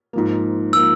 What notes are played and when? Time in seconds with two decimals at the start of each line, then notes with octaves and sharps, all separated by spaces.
0.13 G#2 F3 A#3
0.73 F3 A#3 E6